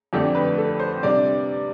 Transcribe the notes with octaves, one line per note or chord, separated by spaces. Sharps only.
F2 D3 A3 D4 G4
B4
A4
C5
C3 G3 D4 D5